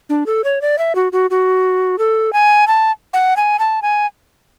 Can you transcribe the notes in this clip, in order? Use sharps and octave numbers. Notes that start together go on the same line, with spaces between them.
D4
A4
C#5
D5
E5
F#4
F#4
F#4
A4
G#5
A5
F#5
G#5
A5
G#5